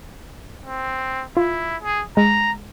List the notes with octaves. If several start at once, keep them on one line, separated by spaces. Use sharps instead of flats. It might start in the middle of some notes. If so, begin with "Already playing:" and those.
C4
E4 F4
G#4
G#3 A#5